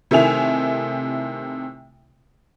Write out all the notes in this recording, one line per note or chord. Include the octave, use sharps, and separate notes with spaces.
C3 D#3 A3 E4 G#5 F7